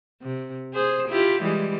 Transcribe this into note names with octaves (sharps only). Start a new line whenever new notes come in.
C3
G#4 C5
E4 F4 G4
E3 G3 G#3